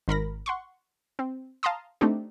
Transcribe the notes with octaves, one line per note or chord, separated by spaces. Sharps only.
G#1 A#4 B5 A#6
F#5 C6 C#6
C4
F5 A5 A#5 C6 D#6
A3 C4 D4 D#4 G4